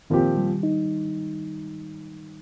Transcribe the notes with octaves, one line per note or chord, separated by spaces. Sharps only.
A#2 D#3 F3 C4 G4
G3
D#4